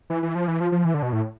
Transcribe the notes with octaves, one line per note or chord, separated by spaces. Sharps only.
E3
E3
F3
E3
F3
F3
E3
D3
B2
A2